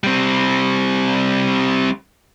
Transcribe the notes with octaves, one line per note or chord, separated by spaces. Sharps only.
G3 C4